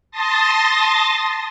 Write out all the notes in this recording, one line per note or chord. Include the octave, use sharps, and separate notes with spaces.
A5 C6 D#6 A6 A#6